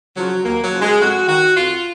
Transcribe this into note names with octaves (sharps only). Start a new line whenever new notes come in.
C#3 F3 F#3
D#2 A#3
F#3
C#3 F3
G#3
F2 F#4
D#3 F#4
F2 F4